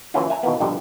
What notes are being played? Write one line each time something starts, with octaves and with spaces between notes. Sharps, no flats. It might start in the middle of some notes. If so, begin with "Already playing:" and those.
E3 F#3 A#3 C#4 E4 F4
E5 G#5 A#5
B2 D#3 E3 A#3 B3
A#1 G2 B2 D3 F3 G3